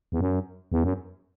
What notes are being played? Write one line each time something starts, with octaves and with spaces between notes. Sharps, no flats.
E2
F#2
E2
F#2